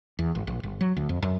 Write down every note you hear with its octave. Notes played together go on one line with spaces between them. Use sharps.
E2
G#1
A#1
G1
F#3
D2
F2
F#2